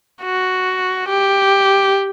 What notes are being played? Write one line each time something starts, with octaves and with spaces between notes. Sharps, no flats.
F#4
G4